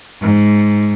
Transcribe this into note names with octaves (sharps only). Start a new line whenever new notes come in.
G#2